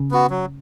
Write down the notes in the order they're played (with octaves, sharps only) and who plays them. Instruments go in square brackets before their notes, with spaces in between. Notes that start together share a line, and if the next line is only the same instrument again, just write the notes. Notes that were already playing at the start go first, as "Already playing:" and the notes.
Already playing: [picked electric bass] C#3
[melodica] B3 F#4
F#3